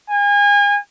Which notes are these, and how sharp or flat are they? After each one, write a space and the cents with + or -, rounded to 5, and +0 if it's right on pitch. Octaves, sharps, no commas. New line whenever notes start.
G#5 -35